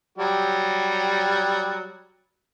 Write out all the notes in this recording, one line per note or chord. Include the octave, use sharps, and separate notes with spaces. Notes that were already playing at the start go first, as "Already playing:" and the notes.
F#3 G3 G4